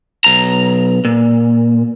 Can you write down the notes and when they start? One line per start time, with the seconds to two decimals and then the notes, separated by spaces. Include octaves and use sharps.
0.24 B1 A#5
1.05 A#2